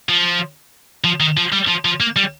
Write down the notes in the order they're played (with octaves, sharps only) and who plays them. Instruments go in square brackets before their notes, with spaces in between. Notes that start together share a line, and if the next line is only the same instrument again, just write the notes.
[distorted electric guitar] F3
F3
D#3
F3
G3
F3
F3
A#3
G3